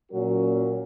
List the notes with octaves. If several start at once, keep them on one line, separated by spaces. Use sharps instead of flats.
A#2 F#3 C#4 F#4 A#4